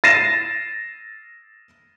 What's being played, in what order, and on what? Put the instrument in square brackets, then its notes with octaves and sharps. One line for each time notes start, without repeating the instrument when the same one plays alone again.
[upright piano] A6 A#6 C7 D#7 E7